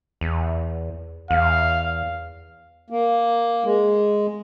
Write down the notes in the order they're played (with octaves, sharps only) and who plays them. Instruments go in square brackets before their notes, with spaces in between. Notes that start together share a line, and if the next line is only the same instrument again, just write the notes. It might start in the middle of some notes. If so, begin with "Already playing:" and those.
[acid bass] E2
[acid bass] E2 [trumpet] F5
[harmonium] A#3
G#3